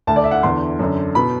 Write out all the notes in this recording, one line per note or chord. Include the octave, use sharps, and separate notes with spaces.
D2 D3 A5
D5
E5
F#5
E2 D3 C6
F#2 D3
B2 B5